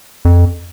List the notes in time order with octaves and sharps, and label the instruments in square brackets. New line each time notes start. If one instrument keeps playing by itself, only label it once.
[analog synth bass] F2